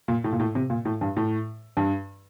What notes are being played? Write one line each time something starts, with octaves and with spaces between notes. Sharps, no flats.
A#2
A2
A#2
A2
C3
A#2
A2
G2
A2
G2